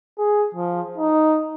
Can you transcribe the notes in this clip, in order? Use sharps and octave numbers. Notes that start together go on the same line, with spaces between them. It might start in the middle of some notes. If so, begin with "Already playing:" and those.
G#4
F3
D#4